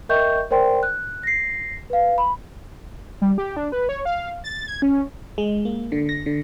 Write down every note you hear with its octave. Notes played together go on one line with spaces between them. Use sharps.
A#4 D#5 E5 G5 C#6 G6
A#4 C5 D5 G5 C6
F#6
A#6 C7
B4 F5
B5
G3
G4
D4
B4
C#5
F5
A6
G#6
C#4
G#3
A#3
D3
A#6
D3